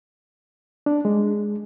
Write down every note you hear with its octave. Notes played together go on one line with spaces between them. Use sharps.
D4
G#3